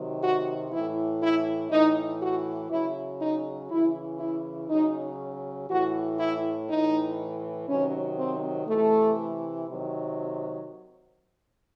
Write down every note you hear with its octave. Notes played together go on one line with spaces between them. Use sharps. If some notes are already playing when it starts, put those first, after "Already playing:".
Already playing: C3 D#3 F#3
F#4
A2 E3 E4
E4
A2 E3 D#4
F#4
C#3 F#3 E4
D#4
C#3 E3 E4
E4
C#3 F#3 D#4
A2 E3 F#4
E4
A2 E3 D#4
C3 D#3 F#3 C#4
C4
C3 E3 A3
C3 D#3 F#3